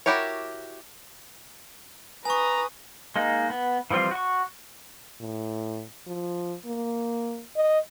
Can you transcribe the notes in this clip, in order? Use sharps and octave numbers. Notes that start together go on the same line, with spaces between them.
E4 F#4 G4 A#4 C#5
B4 G#5 A#5 C#6 D#6
G#3 A#3 D#4
B3
E3 F3 G3 C4 F4
F#4 C#6
A2
F3
A#3
D#5